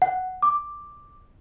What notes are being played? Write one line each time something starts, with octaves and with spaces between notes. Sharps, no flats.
F#5
D6